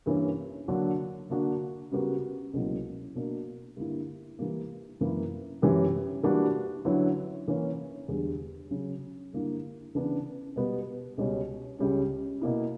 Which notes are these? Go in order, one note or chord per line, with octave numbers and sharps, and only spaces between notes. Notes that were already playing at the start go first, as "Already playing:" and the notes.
G2 E3 A#3 C#4
D3 F#3 A#3 D4 F#4
D3 A#3 D4 F#4
C#3 G3 B3 F#4 A#4
C#2 B2 F#3 A#3 E4
B2 A#3 D4 F#4 A#4
G2 D3 A#3 E4
E3 G3 A#3
F#2 E3 A#3 E4 B4
F#2 E3 G3 C#4 G4
E3 G3 A#3 D4 F#4
D3 F#3 C#4 E4 B4
E3 A#3 C#4
E2 D3 G3
C#3 F#3 C#4
G2 D3 G3 A#3 E4
C#3 E3 B3 D4
B2 G3 B3
C#2 B2 G3 C#4
C#2 C#3 G3 C#4
B2 A#3 E4